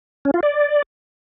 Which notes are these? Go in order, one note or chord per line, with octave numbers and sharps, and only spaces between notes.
C#4
F4
D5